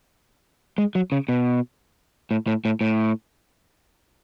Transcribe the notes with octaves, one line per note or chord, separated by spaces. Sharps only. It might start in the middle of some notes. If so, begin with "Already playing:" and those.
G#3
F#3
C#3
B2
A2
A2
A2
A2